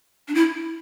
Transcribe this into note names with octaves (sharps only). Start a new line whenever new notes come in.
D4
E4